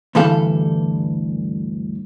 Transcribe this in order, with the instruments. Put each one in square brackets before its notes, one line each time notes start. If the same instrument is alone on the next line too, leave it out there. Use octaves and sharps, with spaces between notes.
[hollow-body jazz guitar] D2 G2 E3 G3 A4 F5